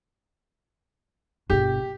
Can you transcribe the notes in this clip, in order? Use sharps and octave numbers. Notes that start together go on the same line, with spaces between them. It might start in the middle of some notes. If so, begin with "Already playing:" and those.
G1 B2 G4